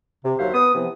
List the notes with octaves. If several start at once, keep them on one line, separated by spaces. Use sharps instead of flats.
C3
D#2 F#3 C5 E5 F5
B3 D#6
C3 E3 F3 B3